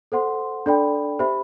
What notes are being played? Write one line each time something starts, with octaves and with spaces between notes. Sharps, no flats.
A4 C5 F#5 C6
D4 A4 D5 G5 B5
G4 C5 E5 B5